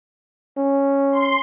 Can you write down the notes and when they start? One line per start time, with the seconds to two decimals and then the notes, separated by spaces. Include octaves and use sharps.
0.57 C#4
1.11 C6